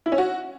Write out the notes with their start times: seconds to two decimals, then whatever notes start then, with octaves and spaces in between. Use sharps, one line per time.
0.06 E4
0.12 C#4
0.18 F#4